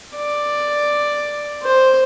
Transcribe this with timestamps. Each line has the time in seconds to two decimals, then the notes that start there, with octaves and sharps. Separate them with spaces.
0.16 D5
1.62 C5